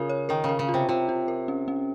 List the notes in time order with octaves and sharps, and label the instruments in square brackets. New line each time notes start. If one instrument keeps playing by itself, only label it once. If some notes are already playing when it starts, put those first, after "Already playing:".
Already playing: [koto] C#3 [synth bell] F4 A#4
[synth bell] C#5
[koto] D#3 [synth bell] A#4
[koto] C#3
[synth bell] A#4
[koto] C#3
[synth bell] F4
[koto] C3
[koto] C3 [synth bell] F4
[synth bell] F4
A#4
C#4
C#4